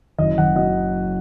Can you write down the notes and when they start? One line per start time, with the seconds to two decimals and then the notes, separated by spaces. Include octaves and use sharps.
0.19 F#1 D#5
0.38 F#1 F#5
0.56 F#3 D#5